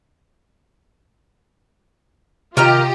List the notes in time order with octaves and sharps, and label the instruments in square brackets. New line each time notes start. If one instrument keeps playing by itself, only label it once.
[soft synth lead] C3 [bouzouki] D#3 F5 A#5 [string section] F4 G4 D#5